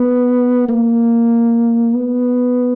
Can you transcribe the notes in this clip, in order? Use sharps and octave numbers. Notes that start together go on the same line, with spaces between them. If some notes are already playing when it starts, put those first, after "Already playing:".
Already playing: B3
A#3
B3